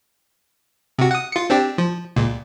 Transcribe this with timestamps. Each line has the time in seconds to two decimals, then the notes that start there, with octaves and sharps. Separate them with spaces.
0.99 C3 F#4
1.11 F#5 D#6
1.32 F4 C#7
1.50 C4 D4 G4
1.78 F3
2.16 C#2 A#2